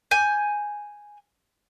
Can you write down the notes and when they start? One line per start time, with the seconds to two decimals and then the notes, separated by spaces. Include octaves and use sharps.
0.11 G#5 G6